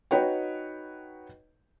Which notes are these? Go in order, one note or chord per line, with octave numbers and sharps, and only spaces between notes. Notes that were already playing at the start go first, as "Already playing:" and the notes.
D#4 F#4 B4 C#5 D#5 G5